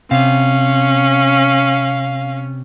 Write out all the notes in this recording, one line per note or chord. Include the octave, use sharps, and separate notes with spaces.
C3 C#4 F5